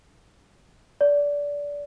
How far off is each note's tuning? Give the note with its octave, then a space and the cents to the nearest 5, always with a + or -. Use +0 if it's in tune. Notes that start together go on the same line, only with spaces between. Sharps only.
D5 -20